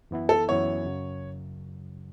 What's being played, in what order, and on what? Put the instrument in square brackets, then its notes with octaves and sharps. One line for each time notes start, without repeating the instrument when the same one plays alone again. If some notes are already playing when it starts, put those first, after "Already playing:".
[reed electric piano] F#2 E3 B3 E4
[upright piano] A4
[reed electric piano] F#2 E3 B3 E4 [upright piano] C#5
[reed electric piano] F#2 C#3 F#3